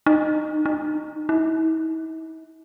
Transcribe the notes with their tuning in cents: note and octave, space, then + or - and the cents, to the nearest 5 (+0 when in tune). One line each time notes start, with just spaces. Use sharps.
D#4 -25
D#4 -30
E4 -45